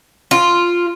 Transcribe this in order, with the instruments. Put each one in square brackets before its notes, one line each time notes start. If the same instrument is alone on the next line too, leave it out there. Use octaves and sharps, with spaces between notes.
[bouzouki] F4